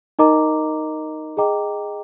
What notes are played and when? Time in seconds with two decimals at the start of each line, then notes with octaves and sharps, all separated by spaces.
0.19 D#4 A#4 D#5 A#5 D6
1.37 G#4 D#5 G5 A#5 D6